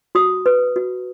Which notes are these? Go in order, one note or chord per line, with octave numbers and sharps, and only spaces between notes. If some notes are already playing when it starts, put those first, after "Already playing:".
F#4 D#6
B4
F#4